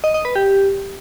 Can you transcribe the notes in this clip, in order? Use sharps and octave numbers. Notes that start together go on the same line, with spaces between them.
D#5
D#5
B4
G4